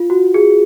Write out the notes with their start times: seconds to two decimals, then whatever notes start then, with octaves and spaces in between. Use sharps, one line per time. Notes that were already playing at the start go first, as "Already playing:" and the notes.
Already playing: F4
0.10 F#4
0.34 G#4